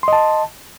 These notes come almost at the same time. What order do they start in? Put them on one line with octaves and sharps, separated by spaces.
C6 D#5 A5